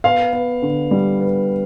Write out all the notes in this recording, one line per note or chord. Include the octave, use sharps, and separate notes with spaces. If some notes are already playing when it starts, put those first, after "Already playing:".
B3 F5
B3
D3
G3
B3